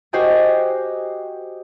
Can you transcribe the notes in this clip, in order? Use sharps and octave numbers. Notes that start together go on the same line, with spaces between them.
F#4 G4 C5 D#5 G#5